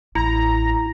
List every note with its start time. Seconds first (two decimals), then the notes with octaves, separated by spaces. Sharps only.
0.15 A1 E4 A#5